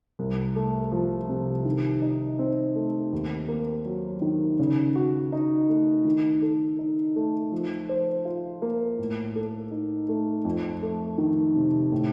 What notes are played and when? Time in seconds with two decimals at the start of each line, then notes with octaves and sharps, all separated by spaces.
0.19 C2
0.56 A3
0.92 F3
1.29 C3
1.65 D#3
2.02 D#4
2.39 C4
2.76 A3
3.13 D#2
3.48 A#3
3.86 F#3
4.22 D#3
4.59 C#3
4.96 F#4
5.32 D#4
5.69 A3
6.05 D#3
6.42 A4
6.79 D#4
7.16 A3
7.52 F3
7.89 C5
8.25 F4
8.62 A#3
8.99 A2
9.36 A4
9.71 D#4
10.09 A3
10.45 F2
10.83 A3
11.18 D#3
11.56 C3
11.92 A2